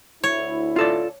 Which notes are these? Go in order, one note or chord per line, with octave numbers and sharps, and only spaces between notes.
D2 E4 C#5
F4 A4 D5